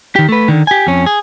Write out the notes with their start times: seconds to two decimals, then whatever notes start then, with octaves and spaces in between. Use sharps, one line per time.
0.16 D#3 G4
0.29 A3 B4
0.48 D3 D#3
0.67 G4 G#5
0.87 F2 C#4
1.06 G#4